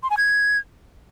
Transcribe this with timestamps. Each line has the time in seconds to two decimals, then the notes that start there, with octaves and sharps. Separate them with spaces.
0.03 C6
0.10 G#5
0.17 G#6